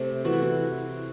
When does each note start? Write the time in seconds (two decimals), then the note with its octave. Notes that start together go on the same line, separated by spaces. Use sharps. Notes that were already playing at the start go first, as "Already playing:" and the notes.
Already playing: C3 A3
0.25 E3 A3 F#4
0.33 E4
0.42 F#4